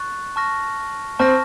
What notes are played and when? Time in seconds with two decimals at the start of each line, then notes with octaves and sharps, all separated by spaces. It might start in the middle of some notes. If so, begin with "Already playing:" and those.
Already playing: C#6 F#6 A6
0.36 A5 C#6 F6 A#6
1.19 C4 A5 C#6 F6 A#6